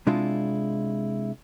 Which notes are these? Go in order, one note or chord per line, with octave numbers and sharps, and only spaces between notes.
C3 G#3 D4 E4 F4